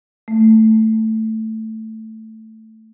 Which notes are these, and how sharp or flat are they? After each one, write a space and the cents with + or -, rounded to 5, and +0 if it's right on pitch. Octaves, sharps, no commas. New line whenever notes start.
A3 +5